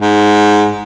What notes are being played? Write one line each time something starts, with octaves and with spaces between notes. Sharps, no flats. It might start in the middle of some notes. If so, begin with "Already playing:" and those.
G#2